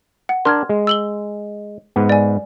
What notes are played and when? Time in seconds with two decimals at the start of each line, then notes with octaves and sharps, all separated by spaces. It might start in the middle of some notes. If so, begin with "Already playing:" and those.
0.29 F#5
0.45 D4 A#4 C6 F6 G#6
0.69 G#3
0.87 E6 F#7 G7
1.96 G#2 B3
2.09 D5 G#5